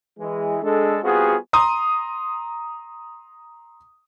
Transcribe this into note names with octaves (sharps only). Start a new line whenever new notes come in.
E3 G#3
G#3 D4 A4
G3 B3 C4 F4 F#4 G#4
A#5 C6 D#6